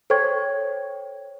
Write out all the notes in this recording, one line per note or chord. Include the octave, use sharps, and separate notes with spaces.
A4 C5 C#5 G5 C#6 G#6